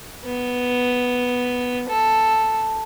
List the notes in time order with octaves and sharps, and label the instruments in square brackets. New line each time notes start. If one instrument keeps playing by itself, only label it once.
[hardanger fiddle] B3
A4